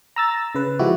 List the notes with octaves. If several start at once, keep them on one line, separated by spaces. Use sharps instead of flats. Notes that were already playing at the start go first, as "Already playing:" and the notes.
A#5 E6 A6
C#3 B4
F3 G#3 E4 F#4 G4